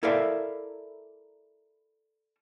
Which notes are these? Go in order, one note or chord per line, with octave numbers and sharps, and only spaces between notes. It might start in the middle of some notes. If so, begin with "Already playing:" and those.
E4 A4 A#4 D5 E5 F5